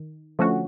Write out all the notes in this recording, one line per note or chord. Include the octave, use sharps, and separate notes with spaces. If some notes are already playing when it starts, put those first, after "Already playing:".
Already playing: D#3
D3 F3 A3 C#4 F#4